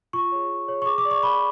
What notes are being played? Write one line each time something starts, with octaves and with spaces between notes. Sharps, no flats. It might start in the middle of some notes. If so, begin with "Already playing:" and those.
F4 C#6
G#4 C#5
F4
G#4 C#5
C#6
G#4 D6
D6
D5
C#6
G#4 B5